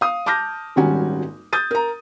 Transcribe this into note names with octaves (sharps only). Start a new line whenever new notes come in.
F5 D#6
A5 D6 F6 G6 A#6
D#1 G#1 G3 C#4 F#4 G#5
D#6 G6 A6 D#7
A#4 A#5